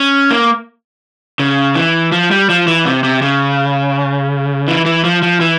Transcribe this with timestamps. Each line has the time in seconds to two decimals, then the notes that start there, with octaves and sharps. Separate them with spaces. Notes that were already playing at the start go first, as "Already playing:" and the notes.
Already playing: C#4
0.31 A#3
1.39 C#3
1.75 E3
2.12 F3
2.31 G3
2.49 F3
2.67 E3
2.85 C3
3.04 C3
3.22 C#3
4.68 E3
4.86 E3
5.04 F3
5.22 F3
5.40 E3